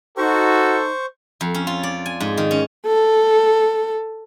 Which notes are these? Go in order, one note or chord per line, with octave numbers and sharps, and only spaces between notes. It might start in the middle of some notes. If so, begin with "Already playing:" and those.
D#4 F#4 A4 C5 C#6
F2
C#4
F4
D5
G#5
G#2
D#3
C#4
A4